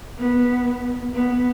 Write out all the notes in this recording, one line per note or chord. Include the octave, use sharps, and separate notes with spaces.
B3
B3